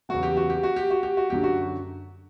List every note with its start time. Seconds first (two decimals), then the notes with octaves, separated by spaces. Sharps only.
0.09 E2 C#3 F#3 F#4
0.23 G4
0.37 F#4
0.50 G4
0.63 F#4
0.76 G4
0.90 F#4
1.03 G4
1.17 F#4
1.30 F#2 D3 F#3 G4
1.43 F#4